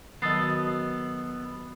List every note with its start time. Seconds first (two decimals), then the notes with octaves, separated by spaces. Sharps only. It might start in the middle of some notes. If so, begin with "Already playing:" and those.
0.22 D#3 F#3 B3 A4 D#5 D#6 A6 C7